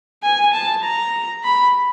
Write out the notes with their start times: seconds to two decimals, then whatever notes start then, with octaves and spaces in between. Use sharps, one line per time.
0.23 G#5
0.53 A5
0.84 A#5
1.44 B5